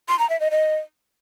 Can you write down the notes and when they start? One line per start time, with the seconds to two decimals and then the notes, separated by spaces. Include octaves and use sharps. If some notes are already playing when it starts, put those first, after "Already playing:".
0.08 C6
0.19 A#5
0.30 E5
0.40 D#5
0.51 D#5